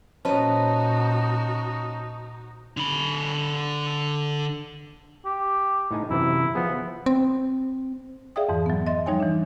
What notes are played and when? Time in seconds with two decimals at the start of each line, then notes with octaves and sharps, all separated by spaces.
0.25 A#2 C#4 D#4 F#4 B4 C5 D#5 A5
2.77 D3 B5
5.25 G4
5.91 A2 D#4 G#5
6.10 F#2 C3 E3 E4
6.55 F3 B3 G#4
7.06 C4
8.36 G#4 D5 E5 F5 G5 D#6
8.49 F2 G#2 E3
8.66 F#3 B3
8.87 D#5 E5 C6 A6
9.06 F3 G3 D#4 C#5 G5 G#5
9.20 E3 D4